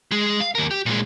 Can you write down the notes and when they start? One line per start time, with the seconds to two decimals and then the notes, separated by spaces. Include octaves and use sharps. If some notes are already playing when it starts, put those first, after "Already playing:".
0.11 G#3 G#4
0.40 F5
0.55 D#2 A#4
0.71 G4
0.86 A#2 G#3